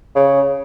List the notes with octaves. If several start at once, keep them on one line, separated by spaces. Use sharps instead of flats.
C#3